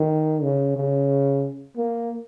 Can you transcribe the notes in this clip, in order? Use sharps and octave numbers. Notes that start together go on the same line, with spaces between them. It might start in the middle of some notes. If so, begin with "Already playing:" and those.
Already playing: D#3
C#3
C#3
A#3